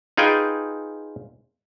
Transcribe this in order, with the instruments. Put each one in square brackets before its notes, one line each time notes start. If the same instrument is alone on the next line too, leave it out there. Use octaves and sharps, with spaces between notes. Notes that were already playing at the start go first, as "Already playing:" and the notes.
[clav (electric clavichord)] D#4 F4 G#4 B4 G5 G#5